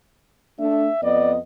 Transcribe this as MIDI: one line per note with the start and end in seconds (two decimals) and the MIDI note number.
0.60 0.88 57
0.60 0.88 62
0.60 1.00 76
1.03 1.38 41
1.03 1.38 59
1.03 1.32 74
1.03 1.38 75